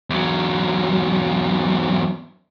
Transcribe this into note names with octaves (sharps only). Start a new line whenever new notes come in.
E2 F#3